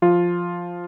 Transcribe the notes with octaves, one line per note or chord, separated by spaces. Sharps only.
F3 F4